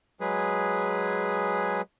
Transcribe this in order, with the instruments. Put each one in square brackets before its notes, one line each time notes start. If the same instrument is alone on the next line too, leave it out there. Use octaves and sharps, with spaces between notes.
[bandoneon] F#3 G#3 G#4 B4